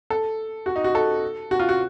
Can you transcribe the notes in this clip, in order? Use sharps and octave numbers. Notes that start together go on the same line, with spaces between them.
A4
F#4
D#4
F#4
A4
F#4
F4
F#4